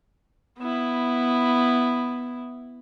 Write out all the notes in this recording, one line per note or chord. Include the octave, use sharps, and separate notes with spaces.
B3 E4